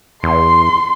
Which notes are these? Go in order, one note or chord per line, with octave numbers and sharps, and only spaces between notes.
E2 C6